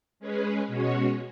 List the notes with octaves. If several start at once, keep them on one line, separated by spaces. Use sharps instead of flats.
G#3 C#4 G#4 B4
B2 G#3 C#4 F#4 C#5